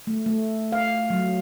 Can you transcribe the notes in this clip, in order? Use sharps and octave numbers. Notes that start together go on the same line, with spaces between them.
A3
A3
F5
F#3